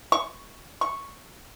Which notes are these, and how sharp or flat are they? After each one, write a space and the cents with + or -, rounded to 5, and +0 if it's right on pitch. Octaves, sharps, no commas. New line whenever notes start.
C#6 +5
C#6 -5